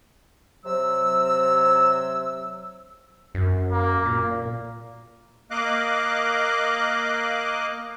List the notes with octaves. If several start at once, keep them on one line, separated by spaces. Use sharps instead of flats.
C3 F#3 E6
F#2
A#3
A#2
A#3 D#5 F5 D6 F#6